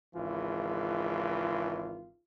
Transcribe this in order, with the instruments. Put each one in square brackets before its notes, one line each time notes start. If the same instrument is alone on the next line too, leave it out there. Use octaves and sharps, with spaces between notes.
[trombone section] G#1 C#2 E3 F4